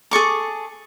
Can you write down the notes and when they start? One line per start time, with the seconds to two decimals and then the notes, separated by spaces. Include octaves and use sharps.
0.11 G#4 A4 C#6 D6